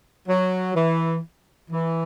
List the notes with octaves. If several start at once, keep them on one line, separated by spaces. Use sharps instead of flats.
F#3
E3
E3